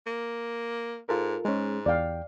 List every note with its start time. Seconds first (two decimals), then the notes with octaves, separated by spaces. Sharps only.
0.07 A#3
1.09 G#2 F4 A4 A#4
1.45 G#2 G#3 C#4
1.86 E2 D5 F5 G5